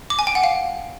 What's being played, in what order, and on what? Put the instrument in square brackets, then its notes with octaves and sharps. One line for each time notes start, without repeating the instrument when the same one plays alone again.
[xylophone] D6
G#5
G5
F#5
F5